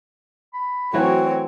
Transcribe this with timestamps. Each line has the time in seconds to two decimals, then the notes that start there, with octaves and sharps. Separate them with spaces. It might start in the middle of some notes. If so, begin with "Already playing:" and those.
0.54 B5
0.94 E3 F#3 A3 C4 F#4 C#5